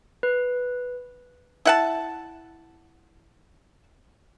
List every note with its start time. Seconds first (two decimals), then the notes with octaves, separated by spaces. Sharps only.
0.23 B4
1.65 E4 F#5 A5